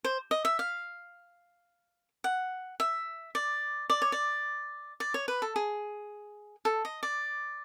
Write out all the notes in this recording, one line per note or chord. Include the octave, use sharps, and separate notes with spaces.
C5
D#5
E5
F5
F#5
E5
D5
D5
C#5
D5
D5
C#5
B4
A4
G#4
A4
D#5
D5